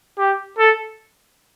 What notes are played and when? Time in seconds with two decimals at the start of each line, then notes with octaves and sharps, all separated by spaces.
0.18 G4
0.59 A4